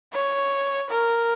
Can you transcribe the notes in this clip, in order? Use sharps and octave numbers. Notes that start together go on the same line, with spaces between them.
C#5
A#4